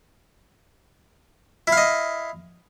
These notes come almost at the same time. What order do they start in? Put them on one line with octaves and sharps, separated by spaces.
E4 F5 D#5